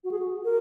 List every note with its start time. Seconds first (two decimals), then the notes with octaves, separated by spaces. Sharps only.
0.04 F#4
0.11 G#4
0.19 F#4
0.45 A#4